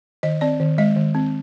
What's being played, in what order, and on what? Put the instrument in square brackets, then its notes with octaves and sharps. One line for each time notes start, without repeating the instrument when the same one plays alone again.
[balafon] D#3 D#5
C4 D5
D#3
G#3 D#5
D#3
C4